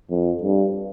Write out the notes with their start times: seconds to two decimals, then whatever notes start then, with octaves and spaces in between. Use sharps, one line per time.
0.10 F2
0.43 G2